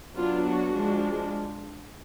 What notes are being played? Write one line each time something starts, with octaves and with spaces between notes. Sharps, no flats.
F#3 B3 D4 F4
F#4
F3 G#3 D4